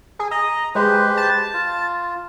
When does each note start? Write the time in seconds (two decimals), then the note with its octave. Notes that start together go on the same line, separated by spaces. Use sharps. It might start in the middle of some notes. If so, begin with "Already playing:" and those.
0.19 G#4
0.31 D#5 A#5
0.75 G#3 G4 B4 C5
1.17 A5
1.53 F4